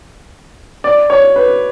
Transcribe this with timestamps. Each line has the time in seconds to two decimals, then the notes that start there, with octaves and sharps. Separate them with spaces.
0.84 D5
1.10 C#5
1.36 B4